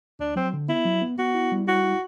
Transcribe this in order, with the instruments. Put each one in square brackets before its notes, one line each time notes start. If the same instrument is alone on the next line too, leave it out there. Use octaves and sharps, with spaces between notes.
[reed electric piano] D2 [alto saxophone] D4
[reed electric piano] F#3 [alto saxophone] C4
[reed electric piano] D3
[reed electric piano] B3 [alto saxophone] E4
[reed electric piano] F#3
B3
[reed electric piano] B3 [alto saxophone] F#4
[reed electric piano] E4
G3
[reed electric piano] E4 [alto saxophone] F#4
[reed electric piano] E4